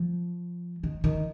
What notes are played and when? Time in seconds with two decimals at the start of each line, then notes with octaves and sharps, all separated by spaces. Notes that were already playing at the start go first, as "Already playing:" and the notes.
Already playing: F3
0.83 D#3
1.04 D#3